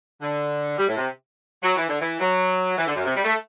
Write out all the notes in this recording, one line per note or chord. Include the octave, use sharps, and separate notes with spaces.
D3
G3
A2
C3
F#3
E3
D3
E3
F#3
E3
D3
F#2
C3
G3
A3